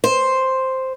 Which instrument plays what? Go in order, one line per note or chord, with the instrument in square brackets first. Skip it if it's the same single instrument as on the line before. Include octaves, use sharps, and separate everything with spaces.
[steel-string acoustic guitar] C5